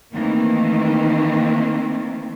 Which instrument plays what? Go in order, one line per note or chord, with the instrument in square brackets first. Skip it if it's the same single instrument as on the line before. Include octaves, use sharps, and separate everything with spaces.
[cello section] D#3 E3 A3 A#3 C4